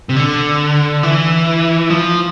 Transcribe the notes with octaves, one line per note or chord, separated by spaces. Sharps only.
C3
D3
E3
F3